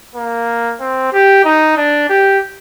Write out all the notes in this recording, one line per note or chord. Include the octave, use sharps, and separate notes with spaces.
A#3
C4
G4
D#4
D4
G4